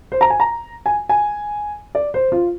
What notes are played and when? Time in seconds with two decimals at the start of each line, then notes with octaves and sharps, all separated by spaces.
0.12 C5
0.21 A#5
0.30 G#5
0.40 A#5
0.86 G#5
1.09 G#5
1.95 D5
2.14 C5
2.32 F4